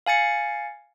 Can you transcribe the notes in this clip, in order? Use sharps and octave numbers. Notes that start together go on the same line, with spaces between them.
F5 G#5 A6 C#7